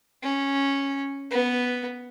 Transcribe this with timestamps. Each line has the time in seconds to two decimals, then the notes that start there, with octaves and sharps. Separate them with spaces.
0.22 C#4
1.31 B3